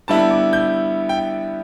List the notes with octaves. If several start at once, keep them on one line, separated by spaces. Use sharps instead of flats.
D3 G3 B3 E4 A5
D6
G6
G5